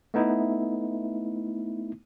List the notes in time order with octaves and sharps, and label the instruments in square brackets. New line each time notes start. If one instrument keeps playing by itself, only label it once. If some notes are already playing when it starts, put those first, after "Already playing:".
[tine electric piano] A3 B3 D#4 E4